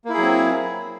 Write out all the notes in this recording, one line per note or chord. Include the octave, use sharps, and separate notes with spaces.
F#3 A#3 C4 E4 G#4